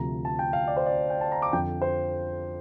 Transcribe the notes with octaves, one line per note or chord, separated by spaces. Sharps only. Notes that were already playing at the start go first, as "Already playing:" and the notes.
Already playing: D2 C3 F3 A#5
A5
G5
F5
D5
C5
D5
G5
A5
A#5
D6
F2 D3 F3 G5
C5